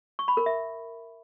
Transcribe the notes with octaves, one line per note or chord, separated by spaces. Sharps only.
C#6
B5
A#4
E5